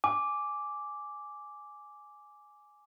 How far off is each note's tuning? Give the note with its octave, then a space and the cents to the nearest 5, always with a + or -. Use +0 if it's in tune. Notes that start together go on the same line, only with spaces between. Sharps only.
G#5 +5 D6 -5